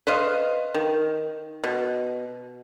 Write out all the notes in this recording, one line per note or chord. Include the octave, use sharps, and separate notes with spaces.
B4 C5 D#5 F5
D#3
B2